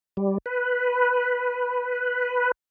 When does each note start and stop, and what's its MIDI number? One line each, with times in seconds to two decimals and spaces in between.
0.17 0.38 55
0.46 2.52 71